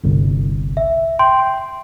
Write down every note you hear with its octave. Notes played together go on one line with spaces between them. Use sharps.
G1 C2
E5
G5 C6